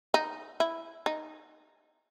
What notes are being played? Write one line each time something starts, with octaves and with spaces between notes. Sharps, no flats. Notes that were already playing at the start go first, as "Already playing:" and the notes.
D#4
E4
D#4